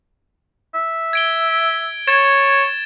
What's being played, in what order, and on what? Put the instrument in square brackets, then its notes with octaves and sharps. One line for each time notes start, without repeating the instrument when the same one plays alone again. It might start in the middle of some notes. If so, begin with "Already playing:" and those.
[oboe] E5
[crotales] G#6 D7 G7
[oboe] C#5 [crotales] G#6 A6 E7